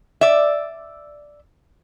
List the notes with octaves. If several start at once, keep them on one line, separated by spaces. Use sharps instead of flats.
D5 E5